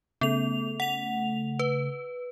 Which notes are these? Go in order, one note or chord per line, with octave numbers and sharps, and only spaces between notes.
C#3 A3 B3 F7
F#5 F7
B4